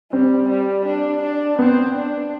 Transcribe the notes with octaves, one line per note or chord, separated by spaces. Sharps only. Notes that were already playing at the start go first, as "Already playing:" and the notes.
G3 C4
G3
D4
D4
B3 C4
D4